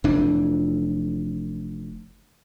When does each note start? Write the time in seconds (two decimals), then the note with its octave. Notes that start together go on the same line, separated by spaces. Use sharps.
0.04 F1 F2 E3 D4